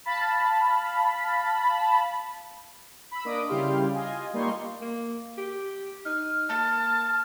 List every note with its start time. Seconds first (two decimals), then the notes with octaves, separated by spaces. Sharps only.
0.05 F5 A5 B5
3.11 B5 E6
3.25 A#3 D4 D#5 D6 D#6 D7
3.48 C#3 G3 E4 G4 F5 C6
3.94 F4 D#5 G#5
4.33 G3 A#3 D#4 C6 C#6
4.81 A#3
5.37 G4
6.05 D#4 F6
6.49 A#3 A5